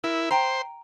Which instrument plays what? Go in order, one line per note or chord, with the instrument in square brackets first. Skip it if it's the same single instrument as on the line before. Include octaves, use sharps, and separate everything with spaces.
[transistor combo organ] E4 [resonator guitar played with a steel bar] A#4
[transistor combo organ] C5 [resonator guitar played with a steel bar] G5 A#5